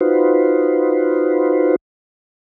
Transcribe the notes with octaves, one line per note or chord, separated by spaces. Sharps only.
D#4 F4 F#4 B4 C5